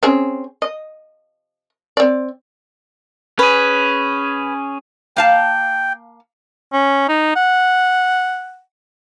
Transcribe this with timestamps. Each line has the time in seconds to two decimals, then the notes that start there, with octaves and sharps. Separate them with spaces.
0.03 C4 C#4 G#4
0.62 D#5
1.97 C4 D5
3.39 C#4 G#4 B4
5.16 A#3 F5 G5 A5
6.73 C#4
7.09 D#4
7.36 F#5